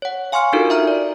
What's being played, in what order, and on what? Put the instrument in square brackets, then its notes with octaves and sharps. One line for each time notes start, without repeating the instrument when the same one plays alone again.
[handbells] C#5 F#5
F5 G#5 C6 C#6 F6 C#7
D4 D#4 F4 F#4 A4 A#4
E5 A#5 F6
D5